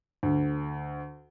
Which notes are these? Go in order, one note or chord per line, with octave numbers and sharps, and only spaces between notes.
D2